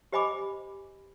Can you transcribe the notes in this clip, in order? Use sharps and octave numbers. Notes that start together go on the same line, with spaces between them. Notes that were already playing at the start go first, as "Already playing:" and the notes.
G4 C5 D#5 G#5 B5 D6